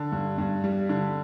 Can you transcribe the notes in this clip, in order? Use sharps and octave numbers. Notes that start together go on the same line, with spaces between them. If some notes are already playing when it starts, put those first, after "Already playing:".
Already playing: D3
G2
G2
G3
D3